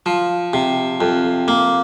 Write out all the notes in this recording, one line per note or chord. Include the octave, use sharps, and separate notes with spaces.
F3
C3
F2
A#3